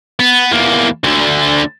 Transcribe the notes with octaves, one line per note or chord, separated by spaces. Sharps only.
B3
E2 A#3
D2 D3